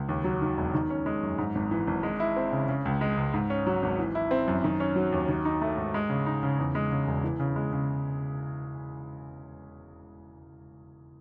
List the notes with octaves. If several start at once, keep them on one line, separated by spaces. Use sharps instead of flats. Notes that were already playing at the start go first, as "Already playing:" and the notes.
Already playing: C#2
D#2
F#3
D#3
E1
D#3
C#4
G#3
F#2
G#2
G#1
E3
G#1
G#3
E4
C4
C#3
C#3
C#2
G#3
C#2
G#2
C#4
F#3
G#1
E3
E4
C4
F#2
D#3
C#4
F#3
D#2
D#3
D#4
A3
G#2
G#3
C#3
D#4
C#3
E2
G#3
C#3
E1
E3
C#3
G#3
C#3